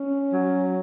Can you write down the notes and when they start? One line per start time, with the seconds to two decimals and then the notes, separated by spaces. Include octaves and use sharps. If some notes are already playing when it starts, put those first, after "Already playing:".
Already playing: C#4
0.31 F#3